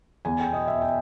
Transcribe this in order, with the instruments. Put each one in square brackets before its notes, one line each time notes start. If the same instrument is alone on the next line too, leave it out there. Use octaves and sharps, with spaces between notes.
[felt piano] E2 G#5
G5
B2 D#5
E5
G5